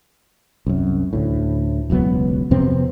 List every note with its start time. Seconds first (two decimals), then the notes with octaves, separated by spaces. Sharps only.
0.67 C2 F#2
1.13 D2 A2
1.90 E1 C#2 F#3 B3
2.51 F2 C3 B3 C4